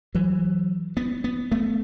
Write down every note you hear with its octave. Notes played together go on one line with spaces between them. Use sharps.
E3 F#3
B3
B3
A3 B3